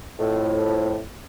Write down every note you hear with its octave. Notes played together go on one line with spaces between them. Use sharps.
F2 A2